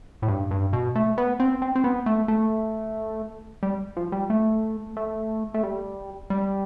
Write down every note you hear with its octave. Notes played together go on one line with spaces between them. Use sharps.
A2
G2
G2
B2
A3
B3
C4
C4
C4
B3
A3
A3
G3
F3
G3
A3
A3
A3
G3
G3